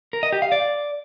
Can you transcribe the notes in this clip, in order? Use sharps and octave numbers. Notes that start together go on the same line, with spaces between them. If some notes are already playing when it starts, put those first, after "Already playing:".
A#4
D#5
G4
F5
D5